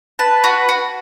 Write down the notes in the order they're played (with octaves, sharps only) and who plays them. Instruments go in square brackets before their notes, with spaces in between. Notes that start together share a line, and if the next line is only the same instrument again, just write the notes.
[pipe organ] B4 [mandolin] A5
[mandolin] F#4
F#4